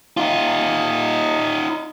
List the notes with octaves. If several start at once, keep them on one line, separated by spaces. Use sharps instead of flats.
D#4 F4